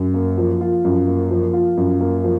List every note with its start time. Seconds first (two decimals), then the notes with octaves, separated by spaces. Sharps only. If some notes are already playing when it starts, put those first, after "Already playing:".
Already playing: F#2
0.14 A#3
0.38 F3
0.61 F4
0.84 F#2
1.08 A#3
1.30 F3
1.53 F4
1.77 F#2
2.00 A#3
2.24 F3